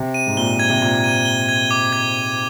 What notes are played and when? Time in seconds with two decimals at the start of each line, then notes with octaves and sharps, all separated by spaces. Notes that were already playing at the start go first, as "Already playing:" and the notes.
Already playing: C3
0.14 D#7
0.27 G#2
0.37 A#2 G7
0.59 G#6
0.70 C3
0.82 A#2 G#6
1.04 D#7
1.25 G7
1.49 G#6
1.71 D6
1.93 G#6
2.15 D#7